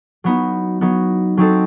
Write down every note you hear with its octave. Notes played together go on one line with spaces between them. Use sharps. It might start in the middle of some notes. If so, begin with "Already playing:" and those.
F#3 B3 D#4
F#3 B3 D#4
F#3 C4 D#4 A4